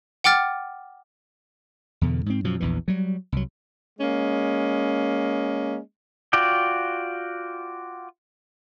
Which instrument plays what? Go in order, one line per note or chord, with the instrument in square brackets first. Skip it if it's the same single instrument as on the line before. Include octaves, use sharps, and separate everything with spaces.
[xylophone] F#5 G5 D6 F6 A6
[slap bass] E2 B2 D3
G#2 C4
F#2 B2 F3
A#1 E2 E3
F#3 G3
C2 F#3
[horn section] G#3 A#3 C#4
[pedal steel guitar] F4 F#4 D5 G5